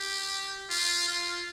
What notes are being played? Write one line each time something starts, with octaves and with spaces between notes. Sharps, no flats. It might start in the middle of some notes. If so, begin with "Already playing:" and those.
Already playing: G4
F4
F4